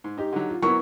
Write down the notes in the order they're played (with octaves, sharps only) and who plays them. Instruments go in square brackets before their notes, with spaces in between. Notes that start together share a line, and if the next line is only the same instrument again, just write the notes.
[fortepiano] G#2
[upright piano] D#4 G4
[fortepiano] D3 F#3
[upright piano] F4
[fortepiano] F#3 [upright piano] B3 E4 A#4 [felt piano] C#6